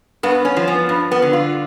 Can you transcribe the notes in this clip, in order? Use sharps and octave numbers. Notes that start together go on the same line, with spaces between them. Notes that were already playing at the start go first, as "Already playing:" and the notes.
G2 B3
C#4
F3
B3
G2
B3
D3
F4